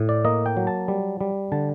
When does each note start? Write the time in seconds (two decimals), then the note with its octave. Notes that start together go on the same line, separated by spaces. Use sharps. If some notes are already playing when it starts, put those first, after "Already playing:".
Already playing: A2
0.09 D5
0.25 A#3 D#5
0.46 G5
0.57 F#3
0.67 A5
0.88 G3
1.21 G3
1.52 D3 A5